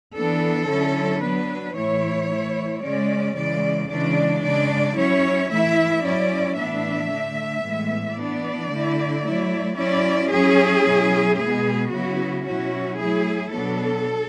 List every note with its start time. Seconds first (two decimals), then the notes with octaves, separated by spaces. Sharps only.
0.15 E3 B3 D4 A4
0.69 D3 F#3 C#4 E4
1.22 F#3 B3 D4 B4
1.76 A2 E3 A3 E4 C#5
2.29 E3 A3 E4
2.83 C#3 G#3 C#4 D5
3.36 C#3 E3 G#3 D5
3.89 C#3 E3 G#3 D4 D5
4.43 C#3 G#3 D4 D5
4.97 F#3 C#4 E4 C#5
5.50 E3 A3 E4 E5
6.03 F#3 C#4 E4 D5
6.57 A2 E3 B3 D4 E5
7.11 D3 A3 D4
7.64 A2 E3 G#3 B3
8.17 E3 B3 D4 D5
8.72 D3 A3 E4
9.25 F#3 A3 E4
9.78 F#3 C#4 E4 D5
10.32 F#3 C#4 E4 G#4
10.85 B2 F#3 C#4 E4
11.39 B2 G#3 B3 G#4
11.92 C#3 F#3 B3 E4 F#4
12.45 B2 F#3 C#4 E4 F#4
12.99 F#3 A3 E4 G#4
13.53 B2 F#3 B3 D4 A4